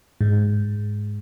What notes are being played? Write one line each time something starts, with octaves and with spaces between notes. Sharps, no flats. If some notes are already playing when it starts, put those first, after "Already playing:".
G#2